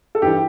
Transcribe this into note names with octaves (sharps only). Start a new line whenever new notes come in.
A4
G2 E3 G4